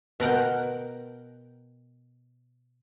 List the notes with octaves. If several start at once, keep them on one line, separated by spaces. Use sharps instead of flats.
B2 A#4 F#5 G5